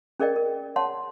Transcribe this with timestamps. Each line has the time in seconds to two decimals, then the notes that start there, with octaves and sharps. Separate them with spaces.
0.20 C#4 G#4 A#4 D5 D#5 G5
0.36 A#4
0.76 C#5 F#5 A5 C6